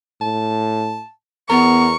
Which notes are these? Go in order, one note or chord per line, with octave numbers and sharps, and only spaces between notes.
A2 A5
E2 B3 A#4 C#6